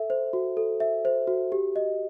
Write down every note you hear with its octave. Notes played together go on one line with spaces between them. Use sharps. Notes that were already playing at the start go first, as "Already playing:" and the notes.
Already playing: A4 E5
C5
F#4
A4
E5
C5
F#4
G4
D#5